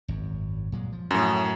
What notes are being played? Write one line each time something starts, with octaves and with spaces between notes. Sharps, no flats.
G#1 F#2
A#2 F#3 G#3
F3
F#2 A2